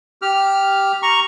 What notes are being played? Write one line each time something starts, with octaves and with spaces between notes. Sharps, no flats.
G4 F6
A#5 C#6